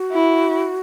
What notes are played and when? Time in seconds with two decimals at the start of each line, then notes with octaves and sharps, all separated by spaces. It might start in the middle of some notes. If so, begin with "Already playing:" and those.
Already playing: F#4
0.12 E4